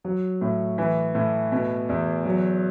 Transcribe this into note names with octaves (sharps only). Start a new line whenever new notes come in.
F#3
A2
E3
A2
B2
E2
F#3